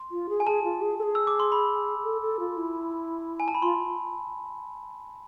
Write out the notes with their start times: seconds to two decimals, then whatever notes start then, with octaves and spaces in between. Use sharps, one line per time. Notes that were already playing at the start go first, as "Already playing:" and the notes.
Already playing: C6
0.11 F4
0.29 G#4
0.40 G#5
0.47 G#4 A5
0.64 F4
0.81 G#4
0.99 A4
1.03 G#4
1.15 E6
1.27 D6
1.40 C6
1.52 B5
2.04 A4
2.21 A4
2.40 F4
2.57 E4
3.40 G#5
3.48 A5
3.55 B5
3.62 F4 C6